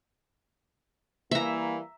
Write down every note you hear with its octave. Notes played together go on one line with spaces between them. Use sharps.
E3 G3 A#3 E5 A#5